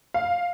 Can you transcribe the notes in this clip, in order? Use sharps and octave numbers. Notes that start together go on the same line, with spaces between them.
F5